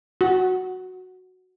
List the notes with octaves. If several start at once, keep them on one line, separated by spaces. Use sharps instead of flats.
F#4